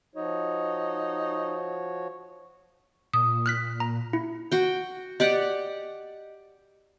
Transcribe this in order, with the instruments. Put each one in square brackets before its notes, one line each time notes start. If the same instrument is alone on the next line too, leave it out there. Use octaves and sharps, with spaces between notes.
[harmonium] F3 F#4 C#5 [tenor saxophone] D#4
[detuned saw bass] A#2 [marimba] D#6
[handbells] F6 F#6 B6
A#5
E4
[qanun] F#4 G5
[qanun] G4 D5 F#5 [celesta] D#5